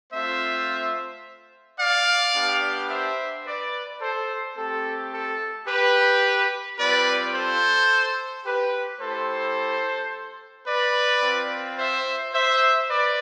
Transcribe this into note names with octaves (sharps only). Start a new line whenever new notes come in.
A3 C4 F4 C5 E5
D5 F5
B3 D4 G4
C5 E5
B4 D5
A4 C5
A3 C4 G4 A4
A4
G4 B4
G3 C4 F4 B4 D5
A4 C5
G4 B4
A3 E4 G4 A4 C5
B4 D5
C4 F4
C5 E5
C5 E5
B4 D5